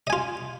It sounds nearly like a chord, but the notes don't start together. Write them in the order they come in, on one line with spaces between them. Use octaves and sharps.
D#5 G#5 F4